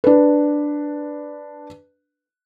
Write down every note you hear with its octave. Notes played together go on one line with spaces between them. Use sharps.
D4 B4